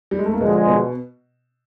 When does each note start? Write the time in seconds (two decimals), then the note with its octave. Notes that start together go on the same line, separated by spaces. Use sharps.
0.11 G3
0.19 G#3
0.26 A3
0.33 A#3
0.40 B2 D3 F3 G#3 B3
0.67 B2 B3